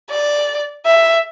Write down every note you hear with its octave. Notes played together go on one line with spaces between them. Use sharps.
D5
E5